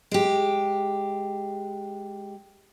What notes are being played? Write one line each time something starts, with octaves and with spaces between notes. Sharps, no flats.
G#3 G4